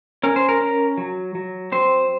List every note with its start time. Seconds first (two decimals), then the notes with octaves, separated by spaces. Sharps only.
0.23 C#4 A#4
0.36 C5
0.49 A#4
0.61 C#4
0.98 F#3
1.35 F#3
1.72 C4 C5